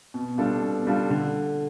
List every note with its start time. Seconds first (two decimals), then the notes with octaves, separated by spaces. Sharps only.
0.14 B2
0.38 G3 D4 F4 A4
0.62 B2
0.87 G3 D4 F4 A4
1.10 D3